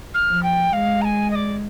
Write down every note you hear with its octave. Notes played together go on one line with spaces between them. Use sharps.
F6
F3
G5
G#3 F5
A#5
G#5
D#5
D5